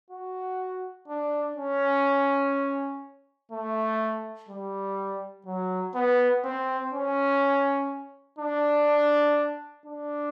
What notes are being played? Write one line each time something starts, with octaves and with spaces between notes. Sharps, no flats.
F#4
D4
C#4
A3
G3
F#3
B3
C4
C#4
D4
D4